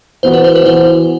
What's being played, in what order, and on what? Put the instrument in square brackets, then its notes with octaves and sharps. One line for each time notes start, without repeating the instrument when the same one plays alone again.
[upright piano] E3 B3 F#4 [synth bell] C5
[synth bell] B4
C5
B4
[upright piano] E3 B3 F#4 [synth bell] C5